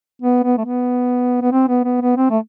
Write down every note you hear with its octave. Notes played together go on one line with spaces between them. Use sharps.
B3
B3
A3
B3
B3
C4
B3
B3
B3
C4
A3